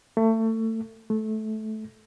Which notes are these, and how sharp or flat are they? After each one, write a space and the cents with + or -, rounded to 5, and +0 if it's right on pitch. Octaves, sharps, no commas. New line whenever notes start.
A3 +25
A3 -20